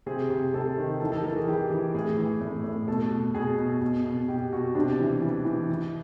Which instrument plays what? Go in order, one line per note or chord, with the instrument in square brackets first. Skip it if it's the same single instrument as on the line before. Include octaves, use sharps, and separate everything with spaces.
[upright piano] C3 G#4
C3
C3 A4
D#3
E3 A4
A4
E3 A#4
G#4
E3 G4
E3
A2 G#4
E3
A2
A2
B2 A4
B2
B2 G#4
B2
B2
B2
B2 G4
B2 F#4
C3 D4
E3
E3
E3
E3